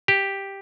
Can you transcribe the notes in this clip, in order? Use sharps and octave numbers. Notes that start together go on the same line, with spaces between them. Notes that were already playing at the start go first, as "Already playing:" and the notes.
G4